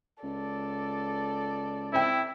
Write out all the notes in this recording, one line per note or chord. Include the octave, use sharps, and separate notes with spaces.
C#2 A4 D5
C4 E4 G5